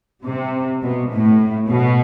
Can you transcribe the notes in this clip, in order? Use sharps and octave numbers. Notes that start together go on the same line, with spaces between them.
C3
B2
A2
B2